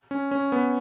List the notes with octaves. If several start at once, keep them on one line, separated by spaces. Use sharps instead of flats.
C#4
C#4
B3